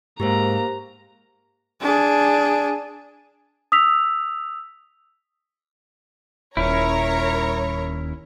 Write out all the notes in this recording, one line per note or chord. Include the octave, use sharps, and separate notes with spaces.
G#2 A#3 G4 A#4 C5 A#5
D4 G#4
D#6 E6 B6 F7
D#1 C#4 E4 A#4 C#5 A#5